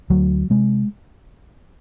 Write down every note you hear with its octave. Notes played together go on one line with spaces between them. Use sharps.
D2 F#3
C3 G#3